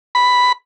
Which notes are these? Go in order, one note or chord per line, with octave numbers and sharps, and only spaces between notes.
B5